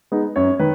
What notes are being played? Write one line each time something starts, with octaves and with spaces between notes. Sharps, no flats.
G#3 B3 D#4
F#2 C#5
D#3 B4